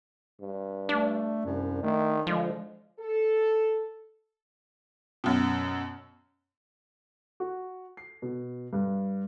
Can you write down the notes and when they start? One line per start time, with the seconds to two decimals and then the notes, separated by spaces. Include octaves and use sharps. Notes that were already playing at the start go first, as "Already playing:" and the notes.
0.41 G2
0.89 A3 D4
1.45 C2 F#2
1.83 D#3 A3
2.27 D3 F3 G#3
2.99 A4
5.24 F#2 B2
7.40 F#4
7.97 C7
8.22 B2
8.73 G2